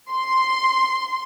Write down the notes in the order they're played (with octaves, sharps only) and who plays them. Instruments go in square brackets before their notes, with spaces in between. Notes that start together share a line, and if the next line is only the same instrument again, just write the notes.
[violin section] C6